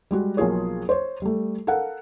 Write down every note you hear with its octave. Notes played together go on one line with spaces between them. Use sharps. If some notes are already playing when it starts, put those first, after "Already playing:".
G3 G#3 F#4
B1 F3 A#3 F4 G#4 C#5
C5 C#5
G3 A3
A4 A#4 F5 F#5